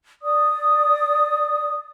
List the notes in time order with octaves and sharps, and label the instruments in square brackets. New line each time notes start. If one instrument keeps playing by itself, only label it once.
[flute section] D5 D#6